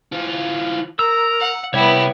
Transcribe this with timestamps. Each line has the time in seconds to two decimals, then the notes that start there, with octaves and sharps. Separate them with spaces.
0.12 E3 F4
0.99 A#4 A#5 E6
1.40 F#5
1.74 C3 G3 B3 E4 C#5 G5